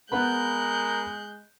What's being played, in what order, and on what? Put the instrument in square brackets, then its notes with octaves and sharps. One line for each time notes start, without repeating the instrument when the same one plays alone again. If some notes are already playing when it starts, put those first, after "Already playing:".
[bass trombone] G#3 [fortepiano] B3 B4 B5 [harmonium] A#4 [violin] F#6 G6